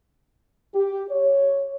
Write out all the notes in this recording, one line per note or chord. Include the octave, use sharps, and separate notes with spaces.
G4
C#5